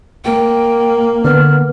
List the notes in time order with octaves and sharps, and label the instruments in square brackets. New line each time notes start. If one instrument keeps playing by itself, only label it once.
[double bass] A#3 [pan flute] G5
[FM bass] D3 [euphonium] B3 [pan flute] F6